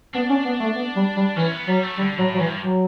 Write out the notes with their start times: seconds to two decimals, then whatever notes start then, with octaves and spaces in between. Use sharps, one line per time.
0.14 B3 D4
0.29 C#4
0.45 B3
0.60 A3
0.76 B3
0.96 G3
1.17 G3
1.36 E3 C#4
1.52 B3
1.67 F#3 G3
1.83 A3
1.98 D3 G3
2.18 A2 F#3
2.35 F#3
2.38 G2 E3
2.59 F#3